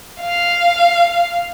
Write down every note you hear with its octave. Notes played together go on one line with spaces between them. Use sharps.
F5